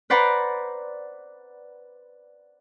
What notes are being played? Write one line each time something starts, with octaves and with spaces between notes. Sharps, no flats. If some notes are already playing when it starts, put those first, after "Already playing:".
B4 C5 D5 F#5 A#5 B5